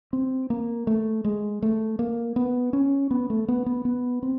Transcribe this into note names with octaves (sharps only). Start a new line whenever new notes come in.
C4
A#3
A3
G#3
A3
A#3
B3
C#4
B3
A3
B3
B3
B3
C4